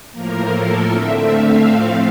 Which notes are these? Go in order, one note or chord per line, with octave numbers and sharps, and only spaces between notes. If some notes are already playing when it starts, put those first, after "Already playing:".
A2 F3 A#3 A#4
A4
D3 A3 C4 E5
F5
A2 F3 A3 C4